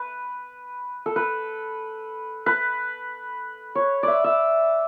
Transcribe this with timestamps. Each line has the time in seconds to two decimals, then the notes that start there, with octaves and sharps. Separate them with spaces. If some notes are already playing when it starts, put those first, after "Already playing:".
Already playing: B4
1.06 A4
1.16 B4
2.46 B4
3.75 C#5
4.03 D5 E5
4.24 E5